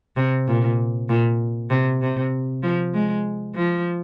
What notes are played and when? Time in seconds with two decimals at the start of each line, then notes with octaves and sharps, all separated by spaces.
0.17 C3
0.48 A#2
1.09 A#2
1.70 C3
2.01 C3
2.63 F3
2.94 G#3
3.55 F3